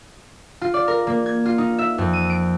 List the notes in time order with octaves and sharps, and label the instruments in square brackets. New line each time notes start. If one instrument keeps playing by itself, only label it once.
[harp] F4
D5
A#4
A#3
G#6
F4
D#4
E5
F2
D#7
D7